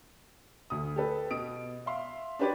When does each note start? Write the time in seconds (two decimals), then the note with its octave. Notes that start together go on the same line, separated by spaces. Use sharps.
0.70 D2 D#6
0.96 G4 A4 B4
1.31 B2 D#6 D7
1.86 E5 F5 C6
2.39 D4 F#4 G4 B4 C#5 D5